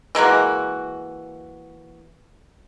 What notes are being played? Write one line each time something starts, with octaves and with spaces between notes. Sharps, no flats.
E3 G#3 A#3 F#4